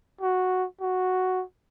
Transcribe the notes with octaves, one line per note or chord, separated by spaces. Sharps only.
F#4
F#4